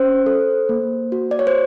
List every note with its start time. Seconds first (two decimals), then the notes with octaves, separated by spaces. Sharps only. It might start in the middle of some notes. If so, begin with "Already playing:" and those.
Already playing: C#4 C5
0.26 A4
0.69 A#3
1.12 F#4
1.31 D5
1.39 C#5
1.47 C5